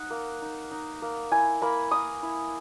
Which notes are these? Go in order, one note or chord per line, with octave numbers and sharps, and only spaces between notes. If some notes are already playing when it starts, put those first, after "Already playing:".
Already playing: D#4 F#5
A#3
D#4
D#4
A#3
E4 G#5
A#3 B5
A#3 D#6
E4